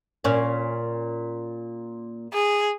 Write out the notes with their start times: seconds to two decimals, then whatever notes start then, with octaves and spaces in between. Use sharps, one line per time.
0.24 A#2 C#4
2.34 G#4